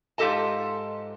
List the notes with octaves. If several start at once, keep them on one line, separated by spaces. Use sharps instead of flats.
G#2 F4 G4 A4 D#5 A5